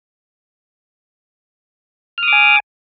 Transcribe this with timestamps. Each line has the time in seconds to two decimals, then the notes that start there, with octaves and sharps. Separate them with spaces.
2.18 F6
2.23 D#6
2.28 D6
2.33 G#5